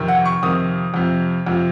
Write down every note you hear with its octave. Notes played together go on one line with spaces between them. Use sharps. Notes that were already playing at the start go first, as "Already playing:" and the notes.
Already playing: F2 C3 D#3
F#5
C#6
F2 C3 D#3 D#6
F2 C3 F3
F2 C3 F3